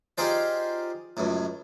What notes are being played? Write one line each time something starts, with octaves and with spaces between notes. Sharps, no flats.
D#4 F4 G4 G#4 C5 D5
C#2 F#2 A2